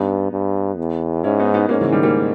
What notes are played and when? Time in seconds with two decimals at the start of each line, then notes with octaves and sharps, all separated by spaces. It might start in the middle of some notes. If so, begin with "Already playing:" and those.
Already playing: G2 B3 D#4
0.32 G2
0.78 E2
1.23 G#2 C#4 E4
1.39 B3 D#4
1.54 B3 D#4
1.69 G#2 A#3 C#4
1.81 C#3 E3
1.92 D#3 G3
2.03 G3 A#3